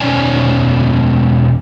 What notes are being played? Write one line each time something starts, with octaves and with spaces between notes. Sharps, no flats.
E2 B2 C#4 C#5 D5 G#5